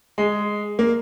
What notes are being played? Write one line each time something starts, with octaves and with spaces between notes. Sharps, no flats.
G#3
A#3